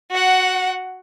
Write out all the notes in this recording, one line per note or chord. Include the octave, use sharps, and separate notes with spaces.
F#4 F#5